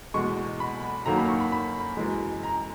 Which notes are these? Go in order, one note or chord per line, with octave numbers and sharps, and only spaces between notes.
E2 B2 G#3 C#6
B5
F#2 D#3 F#3 A#3 A#5
B5
C#6
B5
B5
F#2 E3 G#3
A#5